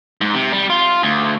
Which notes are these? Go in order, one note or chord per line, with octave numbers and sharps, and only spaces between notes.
G#2
C3
G3
F4
D2